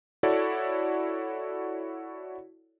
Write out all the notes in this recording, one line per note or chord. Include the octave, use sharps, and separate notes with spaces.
E4 F#4 A4 C#5 D5